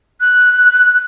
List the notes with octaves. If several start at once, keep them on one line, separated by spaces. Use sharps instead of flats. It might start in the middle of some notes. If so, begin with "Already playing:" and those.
F#6